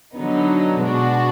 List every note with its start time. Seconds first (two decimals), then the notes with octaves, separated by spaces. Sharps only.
0.14 D3 F#3 B3 D#4
0.81 B2 G#3 D4 F#4